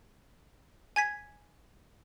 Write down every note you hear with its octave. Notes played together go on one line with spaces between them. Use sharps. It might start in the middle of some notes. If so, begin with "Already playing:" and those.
G#5 G#6 B6